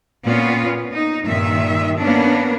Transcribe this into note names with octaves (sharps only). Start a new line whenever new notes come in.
A#2 B3 C#4 F4
D#4
G2 A#2 D#3 E5
A#3 B3 C#4 D4